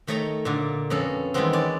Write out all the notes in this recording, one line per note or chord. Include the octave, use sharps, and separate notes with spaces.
D#3 A3 C#5 D#5 A#5
A#2 D3
F2 B2 C#4 A4
D#3 E3 G3 G#3 B3 C4
C#4 D5 G#5